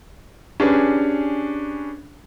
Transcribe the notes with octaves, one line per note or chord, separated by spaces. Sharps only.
C#4 D4 G4 G#4 B4